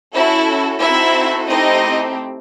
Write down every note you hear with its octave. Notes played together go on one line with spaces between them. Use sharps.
C#4 E4 F#4 A4 E5
C4 D#4 E4 F#4 A4 E5
A3 C4 D#4 E4 G4 D#5